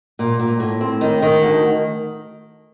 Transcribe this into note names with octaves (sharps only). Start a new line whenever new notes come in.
A#2
A#2
A2
C4
D#3
D#3
D2